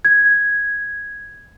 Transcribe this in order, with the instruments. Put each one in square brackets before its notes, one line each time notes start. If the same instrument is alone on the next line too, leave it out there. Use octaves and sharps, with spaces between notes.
[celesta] G#6